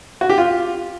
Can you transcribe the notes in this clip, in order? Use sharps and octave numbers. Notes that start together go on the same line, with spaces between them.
F#4
G4
F4